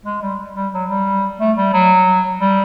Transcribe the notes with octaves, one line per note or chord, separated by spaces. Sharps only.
G#3
G3
G3
F#3
G3
A3
G3
F#3
G3